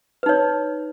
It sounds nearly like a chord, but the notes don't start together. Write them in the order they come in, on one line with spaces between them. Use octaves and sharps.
B4 D#4 C#5